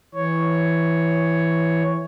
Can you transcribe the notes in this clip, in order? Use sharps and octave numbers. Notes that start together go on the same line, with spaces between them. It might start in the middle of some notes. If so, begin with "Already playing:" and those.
E3 C#5